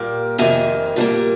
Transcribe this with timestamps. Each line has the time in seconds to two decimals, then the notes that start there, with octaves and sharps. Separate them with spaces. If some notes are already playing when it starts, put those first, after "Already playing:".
Already playing: A#2 G3 A#3
0.38 F2 C3 D#3 A#3 G#5
0.96 A#2 G3 A#3